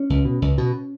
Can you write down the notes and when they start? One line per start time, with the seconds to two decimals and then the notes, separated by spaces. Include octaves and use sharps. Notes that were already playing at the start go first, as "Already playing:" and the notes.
Already playing: C#4
0.10 C#2
0.25 B2
0.42 C#2
0.58 B2